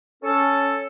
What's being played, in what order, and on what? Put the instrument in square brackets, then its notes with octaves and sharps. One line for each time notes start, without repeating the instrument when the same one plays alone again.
[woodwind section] C#4 A4